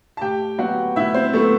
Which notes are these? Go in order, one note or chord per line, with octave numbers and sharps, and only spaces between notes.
A5
A2 G4 G5
F#3 B3 F#4 F#5
A2 E4 E5
C4 C5
F#3 A3 B3 A4